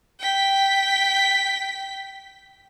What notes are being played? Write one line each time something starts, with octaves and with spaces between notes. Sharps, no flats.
G5 B6